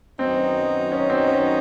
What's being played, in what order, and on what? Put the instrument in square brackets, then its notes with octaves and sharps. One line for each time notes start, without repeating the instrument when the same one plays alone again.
[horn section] F#2 D#3 F#3 B3 D#4 [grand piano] C4
[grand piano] C#4
C4
C#4